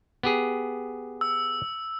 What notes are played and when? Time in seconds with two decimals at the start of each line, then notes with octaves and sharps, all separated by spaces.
0.23 B3 G4 G#4
1.21 E6